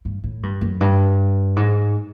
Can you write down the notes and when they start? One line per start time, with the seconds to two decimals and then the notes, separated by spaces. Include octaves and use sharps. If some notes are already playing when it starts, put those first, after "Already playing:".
0.05 G2
0.24 A2
0.43 G2
0.61 F#2
0.81 G2
1.56 G#2